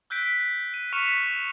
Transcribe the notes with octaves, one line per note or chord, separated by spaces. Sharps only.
E6 F#6 G6 B6 D7
D#7
C#6 F6 B6 C#7 E7 F7